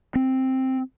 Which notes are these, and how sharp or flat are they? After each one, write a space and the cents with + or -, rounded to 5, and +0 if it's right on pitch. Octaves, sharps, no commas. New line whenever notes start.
C4 +5